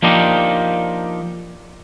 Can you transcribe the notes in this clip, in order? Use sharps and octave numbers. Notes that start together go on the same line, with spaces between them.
F3 A#3 D4 D#4 G4